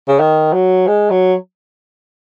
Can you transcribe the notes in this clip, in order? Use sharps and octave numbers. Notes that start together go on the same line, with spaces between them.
C#3
D#3
F#3
G#3
F#3